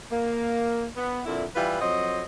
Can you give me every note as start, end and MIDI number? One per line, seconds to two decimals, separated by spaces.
0.11 0.86 58
0.96 1.21 59
1.25 1.44 41
1.25 1.44 46
1.25 1.44 50
1.25 1.44 64
1.56 1.78 52
1.56 1.78 55
1.56 1.78 64
1.56 1.78 65
1.56 1.78 71
1.80 2.22 41
1.80 2.22 54
1.80 2.22 72
1.80 2.22 75